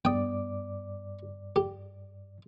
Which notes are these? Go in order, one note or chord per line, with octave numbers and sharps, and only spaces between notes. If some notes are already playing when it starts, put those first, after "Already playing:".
G2 B3 D5 G5 D6 D#6
G4